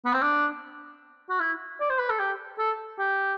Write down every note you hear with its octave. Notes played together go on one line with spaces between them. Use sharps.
B3
C4
D4
F#4
E4
D5
C5
B4
A4
G4
A4
G4